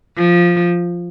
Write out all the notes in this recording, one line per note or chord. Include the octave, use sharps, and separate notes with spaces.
F3